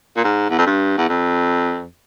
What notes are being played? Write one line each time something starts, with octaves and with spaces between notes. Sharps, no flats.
A#2
G#2
E2
F2
G2
E2
F2